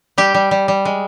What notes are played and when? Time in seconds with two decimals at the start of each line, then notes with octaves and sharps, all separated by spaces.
0.18 G3 G4
0.34 G3
0.51 G3
0.68 G3
0.85 G#3